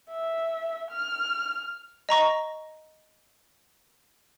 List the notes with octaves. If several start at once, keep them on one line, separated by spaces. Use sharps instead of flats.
E5
F6
D#5 A#5 C#6 A#6